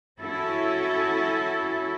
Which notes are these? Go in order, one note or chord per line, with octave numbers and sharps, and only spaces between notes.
C#4 E4 F#4 A4